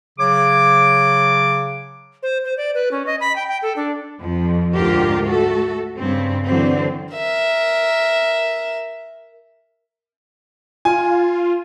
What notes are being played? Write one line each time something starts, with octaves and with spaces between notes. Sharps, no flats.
C#3 F#3 C#5 D6
C5
C5
D5
B4
C#4
D#5
B5
G5
G5
A4
D4
F2 F3
D2 G#2 D3 F4 G4 A#4
A3 F#4 A4
G2 C#3 C4
D3 E3 F#3 C4
A#4 E5
F4 G#5